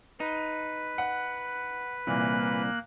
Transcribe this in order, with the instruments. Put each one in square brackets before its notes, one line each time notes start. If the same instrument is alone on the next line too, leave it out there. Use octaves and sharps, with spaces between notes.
[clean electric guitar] D#4 [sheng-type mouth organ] B4
[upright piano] F#5
[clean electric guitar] C2 [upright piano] A#2 E3 [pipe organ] A#3 F#6